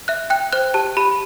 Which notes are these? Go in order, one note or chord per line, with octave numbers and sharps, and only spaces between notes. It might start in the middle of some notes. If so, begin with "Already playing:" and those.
E5 F#6
G5 F#6
C5 F#6
G4 A5
G4 B5